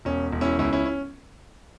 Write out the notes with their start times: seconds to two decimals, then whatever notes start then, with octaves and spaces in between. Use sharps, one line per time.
0.05 E1 C#4
0.32 E1
0.41 C#4 E4
0.59 C#2 C#4 E4
0.73 C#4 E4
0.86 C#4